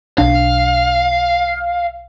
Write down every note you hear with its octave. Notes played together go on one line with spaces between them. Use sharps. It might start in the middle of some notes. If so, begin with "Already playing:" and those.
B1 D4 F5